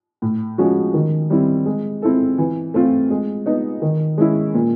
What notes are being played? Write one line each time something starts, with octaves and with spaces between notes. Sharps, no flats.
A2
F3 G#3 C#4 F#4
D#3
G3 C4 E4
G#3
C4 E4 A4
E3
A3 C4 F4
G#3
B3 D#4
D#3
G#3 C#4 E4
A#2